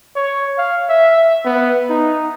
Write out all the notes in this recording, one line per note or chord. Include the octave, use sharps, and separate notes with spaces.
C#5
F5
E5
B3
D#4